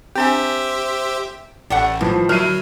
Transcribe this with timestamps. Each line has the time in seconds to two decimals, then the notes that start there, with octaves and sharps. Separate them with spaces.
0.16 C4 D4 G4 C5 E5 G#5
1.70 A1 G3 A3 F#5
2.01 A2 E3 F3
2.29 D3 F#3 E4 E5 F6 D#7